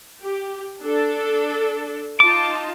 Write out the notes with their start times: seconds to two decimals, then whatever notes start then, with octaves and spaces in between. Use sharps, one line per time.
0.22 G4
0.82 D4 A4
2.20 D#4 F4 A5 D6